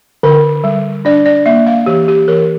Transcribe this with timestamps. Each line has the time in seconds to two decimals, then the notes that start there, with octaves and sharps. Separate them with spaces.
0.23 D3 A#4
0.64 G3
1.05 D4 D5
1.26 D5
1.46 A#3 E5
1.67 F5
1.86 E3 G4
2.08 G4
2.28 E3 A#4